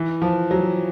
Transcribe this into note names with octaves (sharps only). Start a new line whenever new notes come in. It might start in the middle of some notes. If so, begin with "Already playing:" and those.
Already playing: E3
F3
F#3